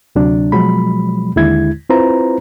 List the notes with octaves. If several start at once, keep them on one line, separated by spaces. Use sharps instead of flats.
D2 C3 F#3 D4
B2 F3 F#3 G#3 B5
D#2 D3 G#3 E4 G#6
C4 E4 F4 B4 C5 A#5